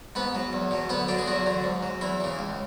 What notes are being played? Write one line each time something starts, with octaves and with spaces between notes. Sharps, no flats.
G#2 B3 B4
F#3
E2
B2 F#3
D2 B3 B4
D3 F#3 D4 D5
G#4
E2 F#3 F#4
D3 F#3
G#2
F#3
E2 E3 E4
C#3 E3
C#2